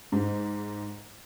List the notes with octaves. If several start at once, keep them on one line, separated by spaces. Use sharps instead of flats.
G#2